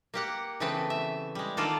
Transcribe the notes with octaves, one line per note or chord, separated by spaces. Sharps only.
A#3 G4 F#5
C#3 E3 A3 B3 C4 B4
E5
G3 G#3
D#3 A#3 D4 F4 A4 D5